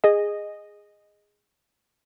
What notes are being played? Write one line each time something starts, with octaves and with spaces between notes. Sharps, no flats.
G#4 D#5